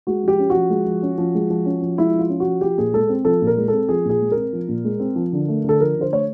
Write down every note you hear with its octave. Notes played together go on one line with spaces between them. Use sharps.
G#3 F#4
F3 G4
C#4
F3 F#4
G#3
F3
C#4
F3
G#3
F3
C#4
F3
G#3 E4
F3
F4
C#4
F#4
F3
F3 G4
A#2 G#4
G#3 A4
C4
F3 A4
A#2
A#4
G#3
C4 A4
F3 G#4
A#2 G#4
G#3
C4 A#4
F3
A#2
G#3
C4
F3
D3
A3
D3 A4
F3 A#4
D3 C5
A3 C#5